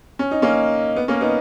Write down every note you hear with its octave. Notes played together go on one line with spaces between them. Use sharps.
C#4
D#4
A#3 C#4
B3
A#3 C#4
B3 D#4